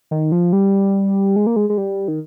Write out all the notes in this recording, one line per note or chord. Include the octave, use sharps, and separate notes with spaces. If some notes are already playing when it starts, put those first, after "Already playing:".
D#3
F3
G3
G#3
A#3
G#3
G#3
G3
D#3